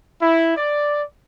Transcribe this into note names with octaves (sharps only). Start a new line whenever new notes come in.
E4
D5